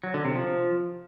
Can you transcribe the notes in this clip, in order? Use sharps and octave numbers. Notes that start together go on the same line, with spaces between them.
F#3
D3
C3
F3